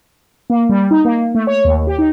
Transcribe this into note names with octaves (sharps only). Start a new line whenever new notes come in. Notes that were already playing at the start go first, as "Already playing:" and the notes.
A#3
G3
D#4
A#3
A3
C#5
D#2
G4
D#4